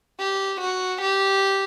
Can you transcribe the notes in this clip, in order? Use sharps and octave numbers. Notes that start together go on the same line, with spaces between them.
G4
F#4
G4